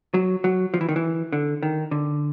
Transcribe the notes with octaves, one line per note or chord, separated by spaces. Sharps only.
F#3
F#3
F3
E3
D#3
E3
D3
D#3
D3